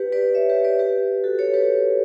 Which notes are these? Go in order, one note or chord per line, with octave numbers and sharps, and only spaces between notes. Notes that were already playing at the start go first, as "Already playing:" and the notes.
Already playing: G4 B4
B4 D5
C#5 E5
G4 B4
B4 D5
G4 B4
F#4 A4
A4 C#5
G4 B4